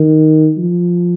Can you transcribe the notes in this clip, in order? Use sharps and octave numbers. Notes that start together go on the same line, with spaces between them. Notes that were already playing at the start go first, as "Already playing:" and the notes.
Already playing: D#3
F3